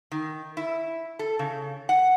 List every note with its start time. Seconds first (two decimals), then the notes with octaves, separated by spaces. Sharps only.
0.12 D#3
0.57 E4
1.19 A4
1.39 C#3
1.89 F#5